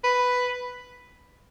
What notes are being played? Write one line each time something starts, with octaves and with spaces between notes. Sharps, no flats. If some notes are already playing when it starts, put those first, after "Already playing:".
B4